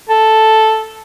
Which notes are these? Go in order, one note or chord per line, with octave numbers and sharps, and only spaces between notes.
A4